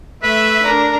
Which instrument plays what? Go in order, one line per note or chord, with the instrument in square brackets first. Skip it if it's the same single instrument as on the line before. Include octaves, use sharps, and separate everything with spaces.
[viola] A3 [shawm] B4 [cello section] E5
[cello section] D4 [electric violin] A#4 A#5